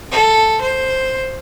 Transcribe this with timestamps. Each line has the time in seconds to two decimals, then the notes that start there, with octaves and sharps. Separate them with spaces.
0.11 A4
0.61 C5